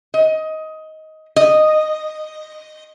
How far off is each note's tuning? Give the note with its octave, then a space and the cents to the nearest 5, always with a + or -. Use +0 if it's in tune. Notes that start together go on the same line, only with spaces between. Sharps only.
D#5 +15
D#5 -10